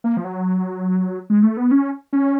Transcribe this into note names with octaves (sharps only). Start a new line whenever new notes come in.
A#3
F3
F#3
G#3
A3
B3
C#4
C#4